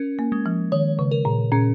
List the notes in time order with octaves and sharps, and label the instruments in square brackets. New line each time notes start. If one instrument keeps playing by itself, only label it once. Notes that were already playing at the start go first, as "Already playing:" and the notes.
Already playing: [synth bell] C#4 A#4
[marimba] A#3
[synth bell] G#3
[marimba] F3
[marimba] D#3 [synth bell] C#5
[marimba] C#3
[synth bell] A#4
[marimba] A#2
[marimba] A#2 [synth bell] C#4